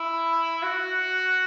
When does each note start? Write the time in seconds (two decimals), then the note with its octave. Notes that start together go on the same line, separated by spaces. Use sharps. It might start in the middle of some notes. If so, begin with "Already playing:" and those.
Already playing: E4
0.63 F#4